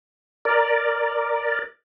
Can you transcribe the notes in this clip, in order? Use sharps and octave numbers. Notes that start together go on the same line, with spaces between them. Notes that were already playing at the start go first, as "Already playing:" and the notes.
A#4 D5